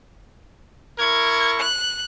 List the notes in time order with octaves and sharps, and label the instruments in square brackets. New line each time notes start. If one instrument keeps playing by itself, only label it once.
[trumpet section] E4 A#4 C#6 [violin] G#6
[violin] F#6